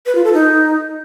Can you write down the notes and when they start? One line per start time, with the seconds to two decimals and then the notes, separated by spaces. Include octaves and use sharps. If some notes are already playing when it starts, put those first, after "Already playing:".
0.06 B4
0.15 F4
0.24 A4
0.33 D#4